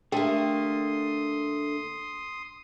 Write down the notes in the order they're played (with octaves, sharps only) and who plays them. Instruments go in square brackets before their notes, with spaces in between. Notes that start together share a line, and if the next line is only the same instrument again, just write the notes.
[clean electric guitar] D3 [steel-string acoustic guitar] A3 A#3 [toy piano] G4 G5 [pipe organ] C6 D#6